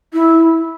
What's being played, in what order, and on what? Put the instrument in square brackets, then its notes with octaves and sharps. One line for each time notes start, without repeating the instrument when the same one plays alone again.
[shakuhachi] E4